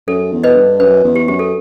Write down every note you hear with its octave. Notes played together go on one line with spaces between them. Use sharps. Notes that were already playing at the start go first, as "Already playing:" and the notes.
F#2 A4
E2
B4 D#5
G2
F#2 B4
E2
G4
F#2 G4
A4